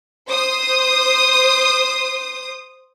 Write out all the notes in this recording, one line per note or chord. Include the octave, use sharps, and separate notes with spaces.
C5 D#6